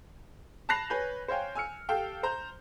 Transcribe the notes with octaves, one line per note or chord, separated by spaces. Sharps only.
A5 B5 F#6 A#6 C7 F7
B4 C#5 G#5 G6
C5 C#5 F5 G5 G#5
G#5 E6 F6 C#7
G4 A4 F5 G5 F6
C5 A#5 G6